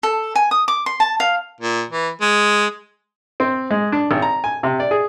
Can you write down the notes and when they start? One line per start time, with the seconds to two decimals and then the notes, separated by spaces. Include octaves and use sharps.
0.03 A4
0.35 G#5
0.51 D#6
0.68 D6
0.86 C6
1.00 A5
1.20 F5
1.60 A#2
1.90 E3
2.21 G#3
3.40 C4
3.71 G#3
3.92 D4
4.11 G#1
4.22 A#5
4.44 G#5
4.63 C3
4.80 D5
4.91 G#4